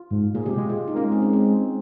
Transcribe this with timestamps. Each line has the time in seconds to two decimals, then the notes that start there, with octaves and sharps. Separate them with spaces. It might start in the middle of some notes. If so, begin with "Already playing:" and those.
Already playing: F4
0.11 G#2
0.34 A#2 G#4
0.46 C3 G4
0.57 G#3 F4
0.69 G#3 F4
0.88 D#4
0.94 A#3 C#4
1.04 G#3
1.12 C4
1.22 C#4
1.33 C4